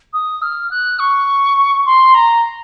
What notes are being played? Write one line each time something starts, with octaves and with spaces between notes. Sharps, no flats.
D#6
F6
F#6
C#6
C6
A#5